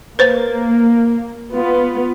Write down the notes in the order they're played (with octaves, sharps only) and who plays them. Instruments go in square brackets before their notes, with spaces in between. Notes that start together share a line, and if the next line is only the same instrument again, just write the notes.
[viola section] A#3 [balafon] B4 C5
[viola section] B3 F4